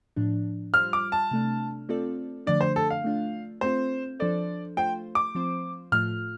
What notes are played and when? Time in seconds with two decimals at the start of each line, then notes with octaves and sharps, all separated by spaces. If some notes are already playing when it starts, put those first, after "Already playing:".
0.16 A2 F3 D4
0.74 G3 F4 C5 F6
0.93 D6
1.12 A5
1.31 C3 A3 D4
1.89 A3 C4 F4 A4 D5
2.46 D3 F3 A3 D4 D5
2.61 C5
2.76 A4
2.90 F5
3.04 A3 D4 F4
3.61 A3 C4 F4 C5
4.20 F3 D4 A4 C5 D5
4.77 A3 F4 C5 G5
5.15 D6
5.35 F3 C4 F4 C5
5.92 A2 F3 A3 F4 F6